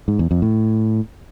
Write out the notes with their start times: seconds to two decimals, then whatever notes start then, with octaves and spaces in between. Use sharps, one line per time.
0.08 G#2
0.19 E2
0.31 F2
0.42 A2